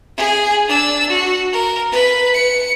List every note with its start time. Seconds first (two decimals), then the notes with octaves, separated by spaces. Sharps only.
0.17 G#4
0.68 D4 E6
1.09 F#4
1.53 A#4
1.92 B4
2.34 C#7